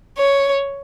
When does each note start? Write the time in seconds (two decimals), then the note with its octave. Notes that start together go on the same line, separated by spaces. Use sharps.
0.18 C#5